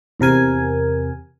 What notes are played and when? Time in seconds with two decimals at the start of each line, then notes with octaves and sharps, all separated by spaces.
0.20 E2 C3 A#4 G#5